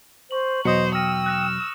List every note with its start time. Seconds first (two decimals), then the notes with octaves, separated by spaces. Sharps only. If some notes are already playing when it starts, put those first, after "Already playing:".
0.31 C5 C#6 F#7
0.65 E2 B2 F#3 C5 D#5 D#6 C#7
0.94 G5 E6 F6 A#6 D#7
1.26 F#6 A#6 E7